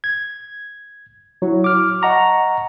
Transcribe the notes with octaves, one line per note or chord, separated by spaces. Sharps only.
G#6
F#3 E4
D6 F6
D#5 F#5 A5 A#5 C#6